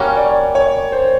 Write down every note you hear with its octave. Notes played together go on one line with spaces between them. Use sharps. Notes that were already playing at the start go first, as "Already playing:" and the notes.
Already playing: G3 A#3 C#4 F#4 A#4 C#5
D5
C#5
C5